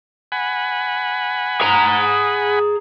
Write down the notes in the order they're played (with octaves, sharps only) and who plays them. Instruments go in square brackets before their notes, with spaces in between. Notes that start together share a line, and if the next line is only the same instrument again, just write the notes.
[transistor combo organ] F#5 G#5 B5
[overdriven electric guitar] G#4 A#5